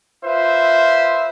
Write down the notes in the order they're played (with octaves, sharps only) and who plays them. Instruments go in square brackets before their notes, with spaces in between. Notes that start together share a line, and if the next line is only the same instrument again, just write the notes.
[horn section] F4 B4 C5 E5